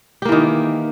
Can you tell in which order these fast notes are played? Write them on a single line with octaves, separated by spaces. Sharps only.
G4 A#3 E3 D#3